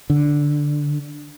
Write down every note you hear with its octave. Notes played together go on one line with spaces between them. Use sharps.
D3